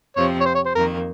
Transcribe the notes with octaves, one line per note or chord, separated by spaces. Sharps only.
F2 C3 F3 C4 C#5
C#5
C5
C#5
C5
F2 D#3 A#3 A#4